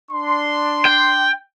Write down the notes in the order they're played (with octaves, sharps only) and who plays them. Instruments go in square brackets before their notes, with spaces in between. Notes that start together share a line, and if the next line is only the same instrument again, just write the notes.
[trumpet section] D4 C6
[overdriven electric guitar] G5